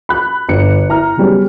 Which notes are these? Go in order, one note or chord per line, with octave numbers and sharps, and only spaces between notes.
B5 F#6
G1 C#7
E4 A#5 F6
C#3 F#3 G3 B3 C#4